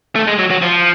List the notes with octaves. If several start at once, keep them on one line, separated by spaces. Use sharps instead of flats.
A3
G#3
F#3
F#3
F3